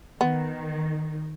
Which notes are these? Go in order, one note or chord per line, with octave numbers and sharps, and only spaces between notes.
D#3 B3